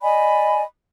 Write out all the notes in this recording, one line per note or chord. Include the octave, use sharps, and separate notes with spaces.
D5 D#5 G#5 B5